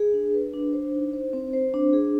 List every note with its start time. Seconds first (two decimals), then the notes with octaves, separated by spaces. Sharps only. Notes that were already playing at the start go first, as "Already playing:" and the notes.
Already playing: G#4
0.13 D4
0.34 B4
0.53 D4
0.73 C5
0.94 D#4
1.13 C5
1.33 C4
1.53 C5
1.74 D4
1.93 G#4